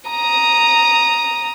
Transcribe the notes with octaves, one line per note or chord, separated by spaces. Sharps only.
A#5 D#6